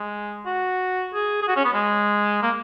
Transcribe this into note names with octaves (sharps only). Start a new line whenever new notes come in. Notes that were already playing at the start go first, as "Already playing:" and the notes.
Already playing: G#3
F#4
G#4
G#4
F#4
C#4
B3
G#3
A#3